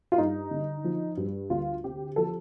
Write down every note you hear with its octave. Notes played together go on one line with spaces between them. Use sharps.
F4
G2 D#4
D3
F3
G2
D2 F4
C3 G4
F3 A4